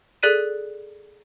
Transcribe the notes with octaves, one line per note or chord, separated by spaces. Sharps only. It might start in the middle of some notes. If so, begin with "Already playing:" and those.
G#4 A4 D5 F#6 B6 D#7